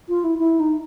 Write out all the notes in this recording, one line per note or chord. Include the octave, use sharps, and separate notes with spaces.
F4
E4
E4
D#4